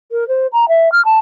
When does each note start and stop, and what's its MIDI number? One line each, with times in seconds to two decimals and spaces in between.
0.12 0.27 70
0.28 0.47 72
0.53 0.68 82
0.68 0.91 76
0.92 1.03 89
1.05 1.19 81